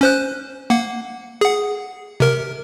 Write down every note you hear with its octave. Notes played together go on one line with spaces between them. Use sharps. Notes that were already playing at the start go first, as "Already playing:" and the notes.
C#4 C5 F#6
A#3 F#5
G#4 F#5
C3 A#4